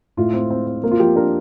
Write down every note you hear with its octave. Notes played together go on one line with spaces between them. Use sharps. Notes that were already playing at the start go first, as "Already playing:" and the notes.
A2 F4
C4
C4
C4
A#3
F4
F3 G4
D4 A#4